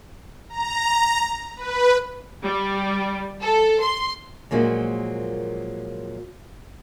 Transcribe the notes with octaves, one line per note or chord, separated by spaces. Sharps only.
A#5
B4
G3
A4
C6
A#2 F3 F#3 G#3 A#3